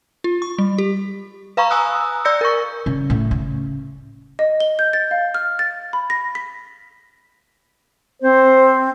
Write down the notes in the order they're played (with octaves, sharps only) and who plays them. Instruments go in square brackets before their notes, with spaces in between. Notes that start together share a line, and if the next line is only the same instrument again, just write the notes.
[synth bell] F4
C#6
G3
G4
B4 F5 A#5 B5 C#6
G#5 A#5 D#6 E6 F#6
D5 E6 G6 A#6 C#7
A#4 C#6
[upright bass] C#3
A2
C#3
[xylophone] D#5
G7
G6
A6
F5
F6
A6
B5
A#6
B6
[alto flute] C4 [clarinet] C5